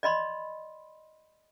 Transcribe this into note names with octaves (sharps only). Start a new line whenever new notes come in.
D5 D#5 B5 C6